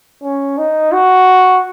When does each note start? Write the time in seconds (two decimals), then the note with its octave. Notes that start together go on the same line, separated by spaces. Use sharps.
0.23 C#4
0.58 D#4
0.92 F#4